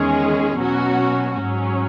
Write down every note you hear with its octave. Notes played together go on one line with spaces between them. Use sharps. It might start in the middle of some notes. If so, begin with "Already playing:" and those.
Already playing: E2 D#3 G#3 C#4 G#4
B2 F#3 C#4 F#4
G#2 F#3 C#4